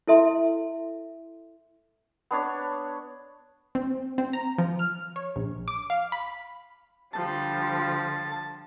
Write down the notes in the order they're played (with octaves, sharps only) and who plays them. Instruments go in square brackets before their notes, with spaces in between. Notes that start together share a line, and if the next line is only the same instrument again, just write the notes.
[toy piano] E4 A4 E5 C6
[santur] B3 D4 C#5
[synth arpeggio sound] C4
C4
A#5
F3
F6
C#5
A#1
D6
F5
B5
[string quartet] D3 F3 G3 [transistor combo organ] A5